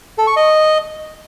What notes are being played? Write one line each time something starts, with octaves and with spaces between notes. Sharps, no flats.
A4
C#6
D#5